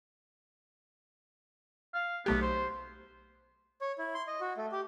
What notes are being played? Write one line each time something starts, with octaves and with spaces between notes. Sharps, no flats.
F5
B1 A3 B3 G4
C5
C#5
E4
C6
D#5
F#4
A3
G4